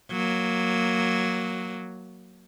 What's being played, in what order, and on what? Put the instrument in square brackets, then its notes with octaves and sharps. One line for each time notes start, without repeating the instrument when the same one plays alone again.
[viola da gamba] F#3 A#3